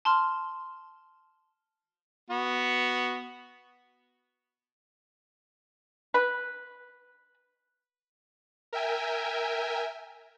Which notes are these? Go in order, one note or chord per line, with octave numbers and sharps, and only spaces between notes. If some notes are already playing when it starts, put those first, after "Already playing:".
A5 C6 F6
B3 F#4
B4
A#4 E5 G5 G#5